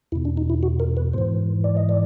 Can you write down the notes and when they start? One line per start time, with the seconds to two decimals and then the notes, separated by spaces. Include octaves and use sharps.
0.12 E2 B2 E4
0.25 D4
0.37 D#4
0.50 E4
0.63 F#4
0.80 A#4
0.97 B4
1.13 G#2 E3 C5
1.64 D5
1.77 D#5
1.89 D5